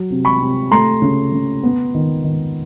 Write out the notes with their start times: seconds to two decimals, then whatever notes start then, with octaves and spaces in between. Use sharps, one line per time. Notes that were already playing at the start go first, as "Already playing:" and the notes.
Already playing: F#3
0.10 C3
0.25 B5 C#6
0.40 C3
0.71 A3 A#5 C6
1.02 C#3
1.32 C#3
1.63 B3
1.95 D#3
2.24 D#3